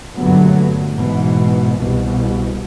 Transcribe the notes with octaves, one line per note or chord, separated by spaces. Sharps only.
G2 A#2 D3 F#3 A3 B3
G#2 B2 E3
C2 B2